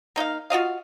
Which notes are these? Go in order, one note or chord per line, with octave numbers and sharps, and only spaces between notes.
A#3 D#4 D#5 F5
F4 F#4 D#5 F5